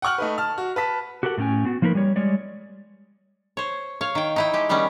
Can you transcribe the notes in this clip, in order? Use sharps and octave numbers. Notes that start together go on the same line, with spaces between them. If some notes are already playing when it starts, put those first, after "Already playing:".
F#5 G5 C#6 F6 F#7
A3 D#4 B4
A5 F6
F#4
B4 A5 B6
F#4 G4 A4 A#4 F#5
A2 A3 C#4 G5 G#5
B3 F#4
F3 A#3 D#4 A#4 B4
G3 C#5
G3 G#3 C#5 D5
C5 C#5
C#5 F5
D#3 G5
D#4 E4 G5
G#3 G4
D#3 G3 B3 C#4 D#4